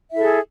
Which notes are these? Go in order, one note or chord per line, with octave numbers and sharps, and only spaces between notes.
E4 G#4 A4 E5